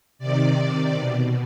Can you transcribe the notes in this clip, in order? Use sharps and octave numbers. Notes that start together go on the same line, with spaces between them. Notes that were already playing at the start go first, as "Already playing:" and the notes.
C3 D#3 D5
D5
B2